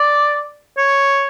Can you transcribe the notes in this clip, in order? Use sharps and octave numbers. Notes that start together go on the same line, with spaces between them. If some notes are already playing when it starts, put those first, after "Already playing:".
Already playing: D5
C#5